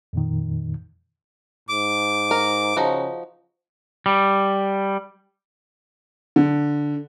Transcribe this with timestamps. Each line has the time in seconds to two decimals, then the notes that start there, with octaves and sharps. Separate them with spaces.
0.13 F2 A#2 D#3
1.69 G#2 D6
2.31 A#4
2.77 C#3 F3 D#4 F#4
4.06 G3
6.36 D3